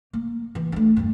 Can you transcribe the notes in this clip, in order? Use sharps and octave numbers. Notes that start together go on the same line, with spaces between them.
A#3
E3
A3 D4
E2 G2